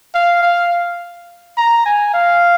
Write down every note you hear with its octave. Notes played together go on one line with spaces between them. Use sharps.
F5
F5
A#5
G#5
F5